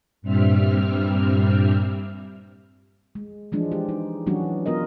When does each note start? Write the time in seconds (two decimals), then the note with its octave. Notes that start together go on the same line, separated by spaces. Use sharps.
0.22 G2 A#2 G3 C4 E5 F6
3.15 G#3
3.52 E3 F3 G#3 D4
3.72 G4
3.89 D#4
4.26 E3 F#3 G3 C#4 D4 F#4
4.66 B3 F4 A#4 D#5